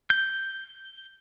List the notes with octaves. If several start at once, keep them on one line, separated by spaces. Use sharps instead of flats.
G6